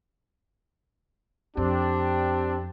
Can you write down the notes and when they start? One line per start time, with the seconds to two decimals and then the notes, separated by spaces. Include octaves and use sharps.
1.57 F2 C4 D4 G4